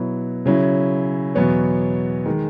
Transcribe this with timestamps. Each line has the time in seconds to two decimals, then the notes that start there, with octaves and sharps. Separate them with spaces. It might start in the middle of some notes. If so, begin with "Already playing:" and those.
Already playing: B2 F#3 B3 E4
0.46 C#3 F#3 C#4 E4
1.35 E2 B2 F#3 B3 C#5
2.26 D#3 G#3